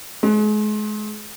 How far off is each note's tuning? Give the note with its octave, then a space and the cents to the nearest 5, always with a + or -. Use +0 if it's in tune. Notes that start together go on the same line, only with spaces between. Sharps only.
G#3 +35